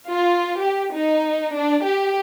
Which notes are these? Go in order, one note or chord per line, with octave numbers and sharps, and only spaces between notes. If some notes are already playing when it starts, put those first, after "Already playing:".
F4
G4
D#4
D4
G4